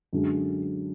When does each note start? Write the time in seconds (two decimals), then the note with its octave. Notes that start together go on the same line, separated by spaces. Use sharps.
0.13 F#2 D3 G#3